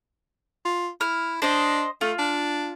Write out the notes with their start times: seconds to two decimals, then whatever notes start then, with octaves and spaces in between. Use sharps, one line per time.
0.65 F4
1.01 E4 F6
1.42 D4 C5 D#5
2.01 A3 F4
2.19 D4